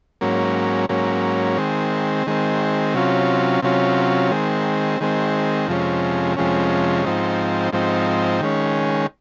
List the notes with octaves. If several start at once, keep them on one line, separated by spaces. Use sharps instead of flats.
G#2 F#3 A#3 C#4
G#2 F#3 A#3 C#4
D#3 G#3 C4
D#3 G#3 C4
C3 F#3 C#4 F4
C3 F#3 C#4 F4
D#3 G#3 C4
D#3 G#3 C4
F2 C3 F3 G#3 C#4
F2 C3 F3 G#3 C#4
G#2 F3 C4 D#4
G#2 F3 C4 D#4
D#3 G#3 C#4